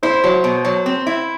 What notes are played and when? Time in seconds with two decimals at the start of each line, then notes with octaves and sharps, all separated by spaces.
0.03 E4 C5
0.24 F#3
0.44 B2
0.65 F#3
0.86 C4
1.07 E4